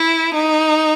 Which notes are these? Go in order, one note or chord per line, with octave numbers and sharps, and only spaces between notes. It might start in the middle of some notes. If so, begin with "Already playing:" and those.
Already playing: E4
D#4